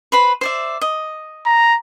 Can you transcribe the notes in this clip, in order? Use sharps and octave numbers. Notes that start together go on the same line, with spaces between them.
B4 C5 B5
C5 D5 E5
D#5
A#5